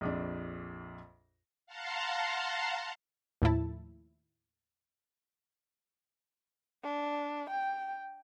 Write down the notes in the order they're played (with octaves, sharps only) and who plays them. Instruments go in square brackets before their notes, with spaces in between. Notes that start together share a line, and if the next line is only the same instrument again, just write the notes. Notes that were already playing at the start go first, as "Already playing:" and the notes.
[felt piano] A#1 F2 D4
[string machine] F5 F#5 A5 A#5 C6
[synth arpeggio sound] D#2 A2 F3 E4 A5
[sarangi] D4
G5